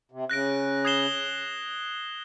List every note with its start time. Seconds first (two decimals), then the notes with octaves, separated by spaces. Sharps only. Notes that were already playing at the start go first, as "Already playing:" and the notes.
0.12 C3
0.29 C#3 F#6 A#6 D7
0.85 D#6 G#6 C7 E7 G7